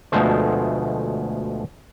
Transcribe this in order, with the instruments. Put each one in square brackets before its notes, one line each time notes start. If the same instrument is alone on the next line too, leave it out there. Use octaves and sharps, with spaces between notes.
[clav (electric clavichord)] D2 B2 F3 G#3 A3 C5